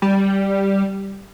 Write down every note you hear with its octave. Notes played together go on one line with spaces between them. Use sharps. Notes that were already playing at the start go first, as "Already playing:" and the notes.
G3